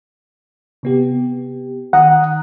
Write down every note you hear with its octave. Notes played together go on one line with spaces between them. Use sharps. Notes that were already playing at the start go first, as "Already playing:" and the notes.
C3 B3 G4
D#3 F#5 A#5 D#6